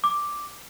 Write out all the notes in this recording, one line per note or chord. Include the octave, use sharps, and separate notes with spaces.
D6